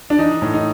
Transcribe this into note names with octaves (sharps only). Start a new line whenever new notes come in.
D4
E3 D#4
A2
D#4